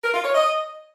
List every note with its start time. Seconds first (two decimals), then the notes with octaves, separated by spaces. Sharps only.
0.04 A#4
0.14 F4
0.24 C#5
0.34 D#5